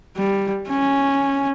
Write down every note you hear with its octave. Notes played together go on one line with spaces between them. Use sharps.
G3
C#4